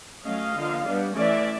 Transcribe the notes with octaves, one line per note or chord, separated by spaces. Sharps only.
F#3 A3 C#4 D#5 F5
D3 F3 A#3
G3 B3 D4
E3 A3 C#4 D5 E5